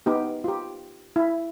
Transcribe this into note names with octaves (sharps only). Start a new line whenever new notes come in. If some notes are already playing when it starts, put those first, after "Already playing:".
B3 D#4 G4
F4 G4
E4